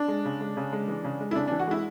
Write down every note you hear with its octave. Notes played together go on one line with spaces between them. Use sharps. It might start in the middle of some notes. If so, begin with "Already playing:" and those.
Already playing: D4
G#3
C#3
G#3
C#3
G#3
E3
C#3
G#3
E4
C#3 D4
E3 D4
F#4
G#3 E4